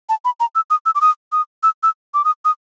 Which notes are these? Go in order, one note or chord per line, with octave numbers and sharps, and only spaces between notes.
A5
B5
A#5
E6
D#6
E6
D6
D#6
D#6
E6
E6
D6
D#6
D#6